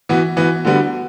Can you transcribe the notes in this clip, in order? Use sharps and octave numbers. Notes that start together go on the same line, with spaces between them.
E3 B3 F#4
E3 B3 F#4
D3 G3 B3 F#4